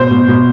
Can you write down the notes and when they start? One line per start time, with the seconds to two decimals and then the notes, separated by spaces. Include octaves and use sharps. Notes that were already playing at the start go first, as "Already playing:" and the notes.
Already playing: B2 C5
0.11 B2
0.28 B2